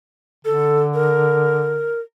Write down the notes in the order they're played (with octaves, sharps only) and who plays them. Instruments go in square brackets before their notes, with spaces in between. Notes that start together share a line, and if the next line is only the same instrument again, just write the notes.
[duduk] D3 [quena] A4
[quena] A#4